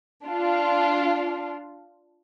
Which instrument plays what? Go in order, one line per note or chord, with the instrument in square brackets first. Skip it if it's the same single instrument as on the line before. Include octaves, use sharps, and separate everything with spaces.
[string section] D4 F4